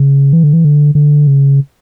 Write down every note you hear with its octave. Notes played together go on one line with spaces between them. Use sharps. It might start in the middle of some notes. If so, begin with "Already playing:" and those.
Already playing: C#3
E3
D3
E3
D3
D3
C#3